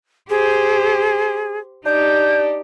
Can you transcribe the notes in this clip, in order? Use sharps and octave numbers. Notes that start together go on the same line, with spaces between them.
G4 G#4 C5
D4 D#4 G4 G6